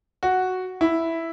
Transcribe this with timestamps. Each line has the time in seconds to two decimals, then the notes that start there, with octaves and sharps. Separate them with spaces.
0.23 F#4
0.81 E4